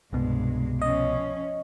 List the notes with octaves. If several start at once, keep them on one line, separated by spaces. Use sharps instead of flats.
C2 G2 B2 G#3
F3 C#4 D#5